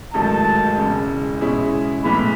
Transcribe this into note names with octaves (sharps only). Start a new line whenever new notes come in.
A1 G#2 D#3 F#3 A3 A5
E1 E2 C#3
B2 G#3 C#4 E4 G#4
B1 A2 E3 G#3 B5